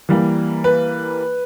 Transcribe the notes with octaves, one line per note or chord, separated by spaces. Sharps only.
E3 G3 A#3
B4